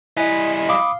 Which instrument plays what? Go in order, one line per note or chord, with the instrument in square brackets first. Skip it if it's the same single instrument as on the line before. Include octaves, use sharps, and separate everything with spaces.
[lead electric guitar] G3 D#5 [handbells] E4 G#5 B6
[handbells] F5 [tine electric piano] B5 D6 D#6